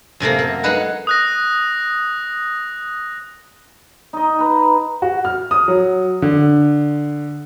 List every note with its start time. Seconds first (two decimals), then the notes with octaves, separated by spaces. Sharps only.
0.20 F#2 C3 A3 A#3
0.39 A#3
0.63 G#3 D#4 B4 F#5
1.07 D#6 F#6 A#6
4.13 D#4 D#5
4.39 B4 A#5
5.02 F#4
5.25 F6
5.51 D#6
5.68 F#3
6.22 D3